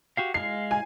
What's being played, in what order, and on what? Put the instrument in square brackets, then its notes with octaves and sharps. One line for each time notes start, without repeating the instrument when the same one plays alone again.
[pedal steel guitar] F#4 G4 F5
[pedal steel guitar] G#3 F5 [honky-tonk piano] C7
[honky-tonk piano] G#5